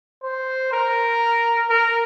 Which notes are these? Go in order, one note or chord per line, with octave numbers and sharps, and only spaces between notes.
C5
A#4
A#4